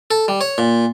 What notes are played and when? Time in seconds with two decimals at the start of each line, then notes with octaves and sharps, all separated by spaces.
0.11 A4
0.28 G3
0.41 C#5
0.58 A#2